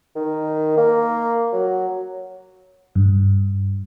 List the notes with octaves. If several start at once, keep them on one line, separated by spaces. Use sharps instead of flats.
D#3
A#3
F#3
G2